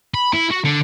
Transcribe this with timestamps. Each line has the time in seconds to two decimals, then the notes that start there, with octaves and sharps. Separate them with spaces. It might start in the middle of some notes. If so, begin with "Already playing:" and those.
0.14 B5
0.33 E4
0.51 F#4
0.65 D3